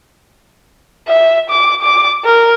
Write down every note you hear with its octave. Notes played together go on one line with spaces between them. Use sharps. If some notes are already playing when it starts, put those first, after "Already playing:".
E5
D6
D6
A#4